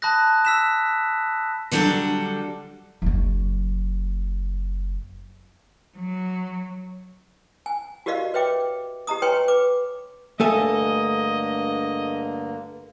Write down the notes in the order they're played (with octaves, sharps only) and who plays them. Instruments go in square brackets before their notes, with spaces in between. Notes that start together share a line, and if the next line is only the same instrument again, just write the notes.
[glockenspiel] A5 B5 D#6 F#6 A#6
E6 B6 E7
[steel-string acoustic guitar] D3 F#3 G3 D4 A4 F#5
[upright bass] F#1 F#2
[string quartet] F#3
[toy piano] G#5
F#4 G4 A#4 D5 D#5 F5
B4 C#5 E5 G5 D6
G4 D#5 A#5 D#6
B4 C#5 G5 G#5 C6 C#6
B4 D6
[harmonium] G2 D3 A#3 [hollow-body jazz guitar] A3 A4 G#5 [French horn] D#5